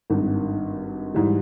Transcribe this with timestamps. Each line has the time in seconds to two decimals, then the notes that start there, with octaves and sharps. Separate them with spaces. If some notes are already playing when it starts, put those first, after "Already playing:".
0.10 G#1 G2 D#3
1.14 G#2 E3 G3